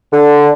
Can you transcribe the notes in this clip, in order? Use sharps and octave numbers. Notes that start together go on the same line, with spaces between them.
D3